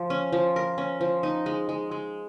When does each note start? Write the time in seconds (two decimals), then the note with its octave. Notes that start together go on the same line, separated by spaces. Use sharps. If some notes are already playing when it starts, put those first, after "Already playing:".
Already playing: F3
0.10 C#4
0.33 F3
0.56 A#4
0.78 C#4
1.01 F3
1.23 D#4
1.46 G#3
1.69 G#3
1.91 G#3